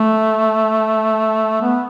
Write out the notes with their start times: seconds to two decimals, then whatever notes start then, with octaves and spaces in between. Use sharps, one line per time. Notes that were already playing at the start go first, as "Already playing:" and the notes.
Already playing: A3
1.62 B3